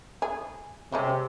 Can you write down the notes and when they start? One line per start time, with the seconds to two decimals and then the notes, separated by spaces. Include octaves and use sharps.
0.22 G#4
0.92 C3 G3 G#3 C#4